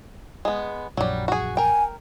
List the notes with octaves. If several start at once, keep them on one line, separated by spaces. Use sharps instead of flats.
G#3 B3
A#1 F#2 F#3 G3
F#4 G#4
A#4 G5 G#5